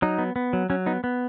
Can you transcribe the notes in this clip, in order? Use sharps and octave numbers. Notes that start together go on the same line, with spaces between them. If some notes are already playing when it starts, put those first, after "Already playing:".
F#3 D#4
B3
B3
F#3
F#3 C#4
B3 D#4
B3